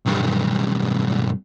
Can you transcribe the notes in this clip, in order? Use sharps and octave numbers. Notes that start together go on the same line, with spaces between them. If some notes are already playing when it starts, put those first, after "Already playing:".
B1 G2